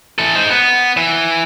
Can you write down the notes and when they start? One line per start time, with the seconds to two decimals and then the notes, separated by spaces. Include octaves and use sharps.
0.19 E3 A4
0.35 D#4 C5
0.49 B3
0.97 E3